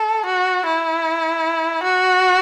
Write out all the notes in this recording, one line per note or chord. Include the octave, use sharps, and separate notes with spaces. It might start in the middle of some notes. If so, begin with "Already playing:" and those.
Already playing: A4
F#4
E4
F#4